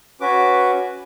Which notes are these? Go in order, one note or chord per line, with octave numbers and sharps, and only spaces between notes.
C#4 F#4 B4 D6